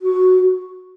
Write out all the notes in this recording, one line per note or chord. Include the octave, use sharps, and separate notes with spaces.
F#4